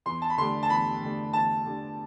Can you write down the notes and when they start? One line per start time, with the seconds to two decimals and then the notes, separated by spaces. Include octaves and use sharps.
0.06 E2 C6
0.22 A5
0.30 B5
0.38 D3 A3 D4 G4 C6
0.63 A5
0.70 E2 B5
1.01 D3 A3 D4 G4
1.33 E2 A5
1.66 D3 A3 D4 G4